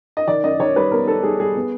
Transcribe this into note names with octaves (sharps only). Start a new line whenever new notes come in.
D#5
D#3 D5
F#2 D#5
D#3 C#5
G3 B4
B3 A#4
B3 A4
G3 G#4
G3 G#4
B3